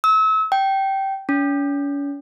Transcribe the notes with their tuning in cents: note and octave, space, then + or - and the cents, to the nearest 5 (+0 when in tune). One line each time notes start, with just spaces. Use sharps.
E6 -35
G5 -15
C#4 +40